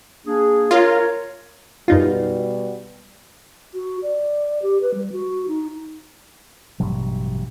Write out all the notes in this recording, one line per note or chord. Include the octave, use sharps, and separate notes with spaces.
A#3 D4 G#4
F4 A#4 C#5
F#2 B2 G3 D#4 F4
F#4
D5
G4
B4
G3
F#4
D#4
A1 G2 B2 F#3